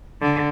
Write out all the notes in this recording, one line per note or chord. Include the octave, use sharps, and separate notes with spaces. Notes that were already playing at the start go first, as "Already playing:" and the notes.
D3